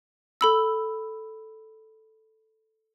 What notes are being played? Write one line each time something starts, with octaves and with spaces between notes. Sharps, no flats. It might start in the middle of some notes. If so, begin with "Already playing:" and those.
A4 B5 E6